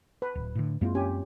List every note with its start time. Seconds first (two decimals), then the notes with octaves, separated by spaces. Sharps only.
0.22 B4
0.35 D1
0.55 A2 D3
0.81 F#2 G#3 A#3 C4 E4 F4
0.95 C#4 G4 G#5